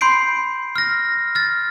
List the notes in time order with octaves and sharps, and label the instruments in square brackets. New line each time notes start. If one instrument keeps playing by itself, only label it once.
[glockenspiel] B5 C6 G6 C7 D7
F6 A#6
F6 A6